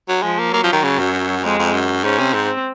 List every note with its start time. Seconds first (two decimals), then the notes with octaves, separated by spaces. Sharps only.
0.09 F#3
0.23 F3 G#3
0.39 A#3
0.53 F#3 A#3
0.64 F3
0.73 D#3
0.84 C#3
0.99 F#2
1.43 F2 G#3
1.59 F2
1.73 F#2
2.04 G#2 C#4
2.19 C3
2.34 G#2 C4